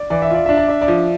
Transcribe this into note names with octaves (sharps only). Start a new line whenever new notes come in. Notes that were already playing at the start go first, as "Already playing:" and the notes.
Already playing: D5
E3 D5
E5
F4 D5
D4 E5
D5
D4 E5
D5
F3